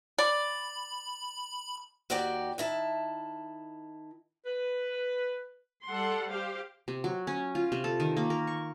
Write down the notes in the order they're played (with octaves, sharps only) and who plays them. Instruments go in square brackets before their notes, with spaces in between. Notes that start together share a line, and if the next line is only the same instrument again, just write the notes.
[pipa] D5 [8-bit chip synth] B5
[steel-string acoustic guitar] D#2 F#4 G4 D5 G5
D#3 E4 A5
[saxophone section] B4
[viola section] G3 A4 F#5 C6
G4 C5 F5
[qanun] C3
F#3
C#4
F4
C3
A4
D#3
A#3
A#4
C#6